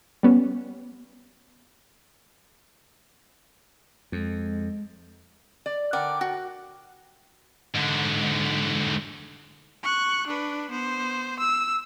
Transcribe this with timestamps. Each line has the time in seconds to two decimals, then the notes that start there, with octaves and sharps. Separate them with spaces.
0.23 G3 B3 C#4
4.12 F2 G#3
5.66 D5
5.93 D3 A#4 D5 F#5 G5
6.21 F#4
7.74 G#2 D3
9.83 C#6 F#6
10.27 D4 B4
10.70 B3 C5
11.39 E6